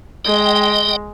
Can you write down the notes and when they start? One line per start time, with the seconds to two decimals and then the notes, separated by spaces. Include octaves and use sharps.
0.25 G#3 D#5 G5